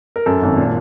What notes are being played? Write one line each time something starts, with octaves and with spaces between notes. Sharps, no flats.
A#4
F#2 A4
G#1
A#2